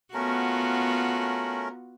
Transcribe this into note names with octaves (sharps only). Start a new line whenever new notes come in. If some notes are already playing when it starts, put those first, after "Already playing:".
A3 B3 C#4 F4 F#4 A#4